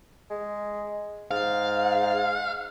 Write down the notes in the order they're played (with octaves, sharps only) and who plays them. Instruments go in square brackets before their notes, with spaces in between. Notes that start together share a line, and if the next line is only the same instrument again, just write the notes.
[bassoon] G#3
[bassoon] G#2 [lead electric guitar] F5